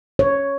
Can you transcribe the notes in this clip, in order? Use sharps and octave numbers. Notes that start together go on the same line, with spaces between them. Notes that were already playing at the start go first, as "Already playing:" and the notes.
C#5